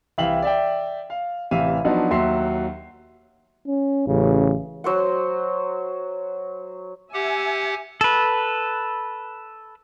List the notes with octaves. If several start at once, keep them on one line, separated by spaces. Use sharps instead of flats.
C2 E3 E5 F5 G5 F#7
D5 E5 G5
F5
A1 C3 E3 E5 F5 D#7
F3 F#3 B3 D4 D#4
D#2 F#3 E5 C6 C7
C#4
A1 C#3
F#3 C5 F#5
G4 E5 F#5 G#5
A4 B4